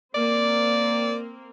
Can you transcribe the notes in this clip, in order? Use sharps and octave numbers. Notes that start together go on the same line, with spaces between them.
A#3 C4 D5